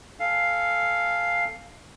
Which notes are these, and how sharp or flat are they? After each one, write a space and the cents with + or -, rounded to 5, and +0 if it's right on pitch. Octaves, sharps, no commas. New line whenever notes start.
A4 +0 F5 +0 G#5 -15